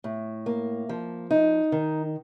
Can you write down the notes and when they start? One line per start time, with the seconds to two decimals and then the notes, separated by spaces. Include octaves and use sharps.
0.04 A2
0.46 A#3
0.89 F3
1.31 D#4
1.72 D#3